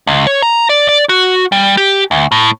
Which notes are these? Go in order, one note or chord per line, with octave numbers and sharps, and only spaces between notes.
C#2
C#5
A#5
D5
D5
F#4
G3
G4
D2
A2